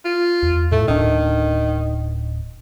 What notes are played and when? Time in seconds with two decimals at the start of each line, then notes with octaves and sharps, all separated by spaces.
0.05 F4
0.43 E2
0.72 A2 A3
0.88 D1 A2 D#3 D4